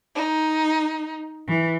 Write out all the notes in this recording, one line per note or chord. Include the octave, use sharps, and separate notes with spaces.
D#4
E3